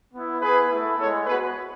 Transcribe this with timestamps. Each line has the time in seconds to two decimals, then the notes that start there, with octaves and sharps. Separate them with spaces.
0.13 B3 E4
0.41 B3 E4 G#4 B4
0.70 A3 E4
0.98 G#3 B3 E4 A4 C#5
1.26 B3 F#4 G#4 B4